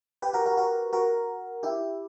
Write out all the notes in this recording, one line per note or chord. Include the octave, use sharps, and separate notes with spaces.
G4 B4
F#4 A#4
F#4 A#4
F#4 A#4
F#4 A#4
E4 G4